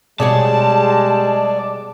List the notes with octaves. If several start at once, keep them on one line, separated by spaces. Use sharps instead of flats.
B2 G3 G#3 G#4 C#5 D5 A5